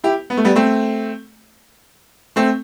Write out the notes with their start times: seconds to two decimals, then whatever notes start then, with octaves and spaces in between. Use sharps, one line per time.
0.04 E4 G4
0.30 B3
0.37 A3
0.45 G3 B3
0.55 A3 C4
2.36 A3 C4